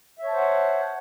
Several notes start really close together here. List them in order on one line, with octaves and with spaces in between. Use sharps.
E5 C#5 A5 C5 F#5